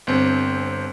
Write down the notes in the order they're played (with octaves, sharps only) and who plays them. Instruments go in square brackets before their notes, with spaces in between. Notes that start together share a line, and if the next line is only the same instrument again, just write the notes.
[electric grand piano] G1 C4